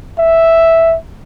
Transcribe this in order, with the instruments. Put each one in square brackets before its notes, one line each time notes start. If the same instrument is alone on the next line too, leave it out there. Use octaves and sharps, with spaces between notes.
[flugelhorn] E5